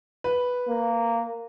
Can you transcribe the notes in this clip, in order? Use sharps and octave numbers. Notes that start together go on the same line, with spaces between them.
B4
A#3